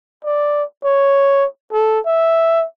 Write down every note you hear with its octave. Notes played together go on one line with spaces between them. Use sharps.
D5
C#5
A4
E5